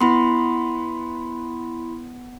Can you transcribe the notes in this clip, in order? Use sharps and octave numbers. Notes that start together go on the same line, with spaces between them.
B3 E4 B5 C6